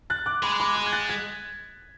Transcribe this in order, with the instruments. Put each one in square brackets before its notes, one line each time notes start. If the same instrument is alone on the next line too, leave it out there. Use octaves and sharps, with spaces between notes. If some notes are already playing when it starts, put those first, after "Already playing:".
[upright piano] F#6 A6
D6 F#6
[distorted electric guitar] G#3 [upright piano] B5 D6
[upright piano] B5 D6
D6 F#6
G#6
F#6 A6
G#6 B6